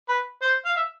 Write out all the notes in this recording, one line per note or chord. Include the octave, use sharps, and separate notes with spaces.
B4
C5
F5
E5